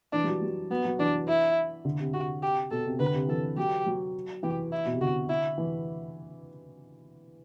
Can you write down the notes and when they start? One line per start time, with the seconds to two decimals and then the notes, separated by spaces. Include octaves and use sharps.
0.13 E3 D4
0.24 G3
0.28 F#3
0.42 G3
0.71 F#3 B3
0.85 F#3
0.99 E3 D4
1.28 E4
1.85 D3
2.00 C3
2.14 C3 F#4
2.42 G4
2.71 B2 A4
2.86 C3
3.00 D3 B4
3.14 C3
3.28 E3 A4
3.57 F#3 G4
3.86 F#3
4.43 E3 G4
4.72 E4
4.85 B2
4.93 C3
5.01 D3 F#4
5.29 E4
5.58 E3